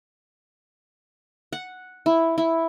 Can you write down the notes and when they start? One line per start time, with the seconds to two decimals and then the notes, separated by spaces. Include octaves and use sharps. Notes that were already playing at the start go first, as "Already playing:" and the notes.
1.53 F#5
2.06 E4
2.38 E4